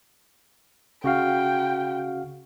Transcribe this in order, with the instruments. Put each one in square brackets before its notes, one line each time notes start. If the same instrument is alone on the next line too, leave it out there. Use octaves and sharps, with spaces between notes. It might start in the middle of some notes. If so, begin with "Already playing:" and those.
[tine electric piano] C#3 F#4 F5 [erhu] G5